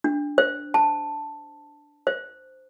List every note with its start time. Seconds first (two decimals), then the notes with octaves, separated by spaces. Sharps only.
0.04 D4
0.38 C5
0.74 A5
2.07 C5